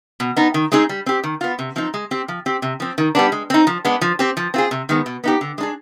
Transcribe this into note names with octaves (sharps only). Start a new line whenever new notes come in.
B2
B3 D#4
D#3
G#3 C4 D#4 G#4
G3
C4 G4
D#3
B3 F4
C3
F3 C4 D#4
G#3
C4 G4
F3
C4 G4
C3
F3 C4
D#3
G3 B3 D4
G#3
C4 D#4
F3
G#3 B3 D4
F3
C4 G4
F3
C4 F4 G#4
C3
D#3 G#3 B3
B2
B3 D#4 G4
D3
G#3 D4 G#4